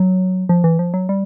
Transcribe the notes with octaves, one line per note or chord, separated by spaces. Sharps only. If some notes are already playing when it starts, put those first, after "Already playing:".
Already playing: F#3
F3
E3
F3
F#3
G3